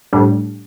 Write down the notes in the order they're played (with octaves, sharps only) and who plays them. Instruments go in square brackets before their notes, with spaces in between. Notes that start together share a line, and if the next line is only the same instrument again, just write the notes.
[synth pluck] A2 G3 D4